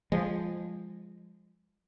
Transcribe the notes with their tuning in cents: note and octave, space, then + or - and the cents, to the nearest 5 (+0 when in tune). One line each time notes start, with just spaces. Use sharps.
F3 +0 G#3 -25